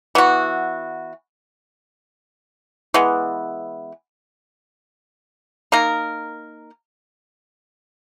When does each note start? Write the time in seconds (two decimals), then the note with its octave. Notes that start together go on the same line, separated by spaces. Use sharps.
0.15 E3 B3 F#4
2.94 E3 G#3 B3
5.72 A#3 D#4 A#4